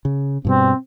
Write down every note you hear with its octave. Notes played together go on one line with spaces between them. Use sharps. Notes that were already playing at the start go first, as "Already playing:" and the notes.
C#3
G2 B2 G3 C4